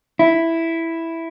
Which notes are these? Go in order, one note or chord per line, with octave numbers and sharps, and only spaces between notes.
E4